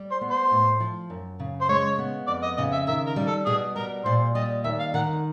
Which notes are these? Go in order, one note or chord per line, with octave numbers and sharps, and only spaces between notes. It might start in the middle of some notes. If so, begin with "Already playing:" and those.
Already playing: G3
C5
B3
C5
A2
F3
F#2
C#3
C5
G#3 C#5
B3
F2 D5
D#5
C#3 D#5
E5
D#3 E5
A#4
G3
A4
B2 G#4
G3 A#4
A#2 C5
G3 D#5
D#2 E5
F5
D#3 F#5